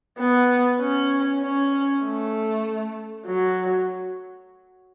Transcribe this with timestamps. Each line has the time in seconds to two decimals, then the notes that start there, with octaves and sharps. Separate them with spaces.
0.19 B3
0.81 C#4
1.42 C#4
2.04 A3
3.26 F#3